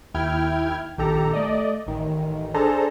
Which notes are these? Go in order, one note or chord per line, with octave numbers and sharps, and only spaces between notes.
D#2 E4 G5 F6 G#6
A#1 D#3 G4 A4 A#5
A3 D5 D#5
A1 D#3
D4 G#4 A4 C5 A5 A#5